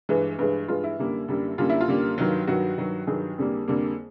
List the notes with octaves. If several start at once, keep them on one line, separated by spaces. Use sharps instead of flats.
G2 E3 G#3
G2 E3 G#3
G2 E3 G#3 F4
E4
F#2 D3 G3 A#3
F#2 D3 G3 A#3
F#2 D3 G3 A#3 F4
E4
F4
F#2 D3 G3 A#3
G2 D#3 F#3
G2 D#3 F#3 F#4
G2 D#3 F#3
G2 D#3 F#3 G#4
F2 D3 G3 A#3
F2 D3 G3 A#3